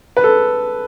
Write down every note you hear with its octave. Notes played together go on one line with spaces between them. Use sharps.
B4
A4